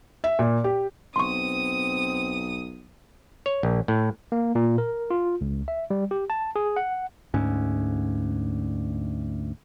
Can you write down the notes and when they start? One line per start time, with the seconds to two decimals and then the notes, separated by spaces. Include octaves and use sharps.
0.24 E5
0.39 A#2
0.64 G4
1.16 B1 C4 C6 C#6 D#6
3.46 C#5
3.63 A#1
3.88 A2
4.32 A#3
4.55 A#2
4.78 A#4
5.10 F4
5.41 C#2
5.68 E5
5.90 G3
6.11 G4
6.30 A5
6.56 G#4
6.76 F#5
7.34 D2 G#2 C#4